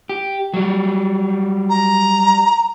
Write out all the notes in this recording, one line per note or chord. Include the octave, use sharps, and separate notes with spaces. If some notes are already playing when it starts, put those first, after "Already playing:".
G4
F#3 G3
A#5